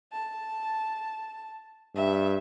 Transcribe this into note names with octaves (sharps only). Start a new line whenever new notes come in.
A5
G2 E5